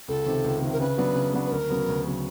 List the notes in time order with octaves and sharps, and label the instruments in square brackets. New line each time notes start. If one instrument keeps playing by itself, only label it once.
[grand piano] C#2 [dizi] A4
[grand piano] C3 D#3
C#2
C3 D#3
[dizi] A#4
[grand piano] C#3 [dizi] B4
[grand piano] F#3 B3 D4 F#4
C#3
F#3 B3 D4 F#4
[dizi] B4
[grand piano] D2 [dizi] A#4
[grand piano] C#3 F#3 B3
D2
C#3 F#3 B3